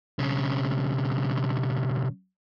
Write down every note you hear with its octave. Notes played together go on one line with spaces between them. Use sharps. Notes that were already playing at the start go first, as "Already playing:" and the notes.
B1 C#3